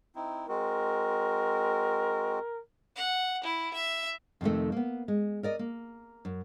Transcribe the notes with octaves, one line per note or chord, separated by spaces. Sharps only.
C4 D#4 E4
G#3 C4 F#4 A#4
F#5
E4
E5
F2 C3 D#3 A3
A#3 B3
G#3
A#4 D5 D#5
A#3
F#2